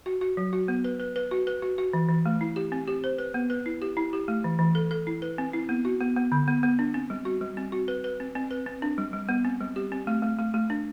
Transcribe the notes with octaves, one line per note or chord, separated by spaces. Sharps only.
F#4
F#4
F#3
F#4
B3
B4
B4
B4
F#4
B4
F#4
F#4
E3
E3
A3
E4
G4
C4
G4
C5
B4
B3
B4
E4
G4
E4
G4
A3
E3
E3
A4
A4
E4
B4
C4
E4
B3
F#4
B3
B3
D3
B3
B3
D4
C4
G3
F#4
G3
C4
F#4
B4
B4
C4
C4
B4
C4
D4
G3
G3
B3
C4
G3
G4
C4
A3
A3
A3
A3
D4